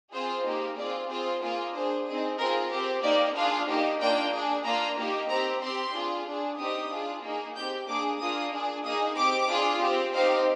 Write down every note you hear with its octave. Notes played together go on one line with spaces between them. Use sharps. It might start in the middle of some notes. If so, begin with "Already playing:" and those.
C4 F4 G#4 C5
A#3 D#4 G4
C4 F4 G#4 D5
C4 F4 G#4 C5
A#3 F4 G#4
D4 G#4 C5
C4 D#4 G#4
C4 F4 G#4 A#4
C4 G4 C5
A#3 D#4 G4 D5
D4 F4 G#4 F5
A#3 D#4 G4
A#3 D4 F4 G5
D4 G#4
A#3 D4 F4 A#5
A#3 D#4 G4
C4 G4 A#5
C4 G4 C6
D4 F4 G#4
D4 G#4
C4 D#4 G4 D#6
D4 F4 G#4
A#3 D#4 G#4
C4 G4 G6
A#3 D4 G#4 D6
A#3 D4 F4 G#4 D#6
D4 G#4
A#3 D#4 G#4 D#6
C4 G4 D6
D4 F4 G#4
C4 G4
C4 D#4 G4 F5